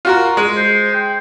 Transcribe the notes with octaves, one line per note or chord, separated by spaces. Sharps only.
F4 F#4 A#4
G#3
C5
G5